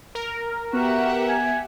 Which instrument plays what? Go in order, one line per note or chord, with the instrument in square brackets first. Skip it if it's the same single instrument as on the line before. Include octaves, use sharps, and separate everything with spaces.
[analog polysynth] A#4
[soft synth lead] B3 [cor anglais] F#4 [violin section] G4 E5 F#5
[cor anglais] G#5